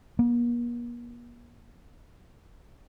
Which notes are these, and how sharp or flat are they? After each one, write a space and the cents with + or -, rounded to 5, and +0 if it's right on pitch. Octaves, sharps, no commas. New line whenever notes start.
A#3 +45